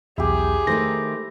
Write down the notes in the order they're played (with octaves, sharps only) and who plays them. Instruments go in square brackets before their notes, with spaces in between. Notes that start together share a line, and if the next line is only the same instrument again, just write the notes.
[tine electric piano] B1 E2 [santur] E4 G4 [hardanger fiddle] G#4
[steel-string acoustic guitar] D#3 A3 D#4 [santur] C5 [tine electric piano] A#6